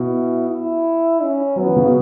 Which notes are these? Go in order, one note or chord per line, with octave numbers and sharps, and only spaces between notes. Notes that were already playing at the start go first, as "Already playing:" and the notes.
Already playing: B2 E4
E4
C#4
F#3 B3
E3
C#3
B2